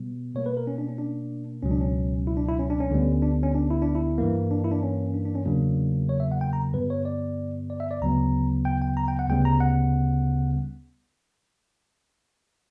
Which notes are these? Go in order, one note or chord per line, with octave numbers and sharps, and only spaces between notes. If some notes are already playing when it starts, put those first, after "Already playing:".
Already playing: B2 G3 B3
B2 A#3 C#5
B4
A#4
C#4
D4
C#4
D4
C#2 B2 F#3 C#4
D4
C#4
E4
D4
E4
C#4
D4
C#4
D2 D3 G3 B3
D4
C#4
D4
E4
D4
E4
G2 E3 A#3
D4
E4
D4
C#4
D4
D4
C#4
E2 C#3 F#3 A#3 D4
C#5
E5
F#5
G5
A#5
G2 D3 G3 B3 B4
C#5
D5
D5
E5
D5
D2 C#3 F#3 B3 A#5
G5
G5
A#5
G5
F#5
D2 C#3 G3 B3 G5
A#5
F#5